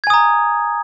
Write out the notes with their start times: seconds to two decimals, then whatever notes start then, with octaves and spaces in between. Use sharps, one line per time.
0.04 G#6
0.07 G#5
0.10 D#6
0.14 A#5